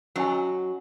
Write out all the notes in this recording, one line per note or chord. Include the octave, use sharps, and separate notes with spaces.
F#3 C#4 D#5 G#5